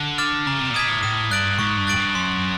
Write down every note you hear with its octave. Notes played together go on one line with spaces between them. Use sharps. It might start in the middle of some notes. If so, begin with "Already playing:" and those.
Already playing: D3
D6 F6 A6
C#3 A#5
C3
A#2
B2 D#6 G#6 B6
A2
A2 D#6
G2 F#6 A6 D7 F#7
G#2 C#6
G2
F#6 A6 D7 F#7
G2
F#2 C6